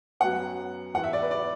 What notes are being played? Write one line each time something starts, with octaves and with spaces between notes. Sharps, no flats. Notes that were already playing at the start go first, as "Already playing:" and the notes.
F#2 F#3 B3 F#5
E2 E3 B3 F#5
E5
D5
B4
D5